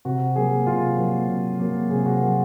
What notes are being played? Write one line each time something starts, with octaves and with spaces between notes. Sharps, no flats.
C3 F#4
F#3 A#3 G#4
C3 F4
F#3 A#3
C3
F#3 A#3
C3 G#4
F#4
F#3 A#3